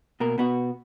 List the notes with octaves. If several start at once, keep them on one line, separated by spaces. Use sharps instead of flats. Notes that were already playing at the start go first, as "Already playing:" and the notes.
B2 A#3 A#4
B2 B3 F#4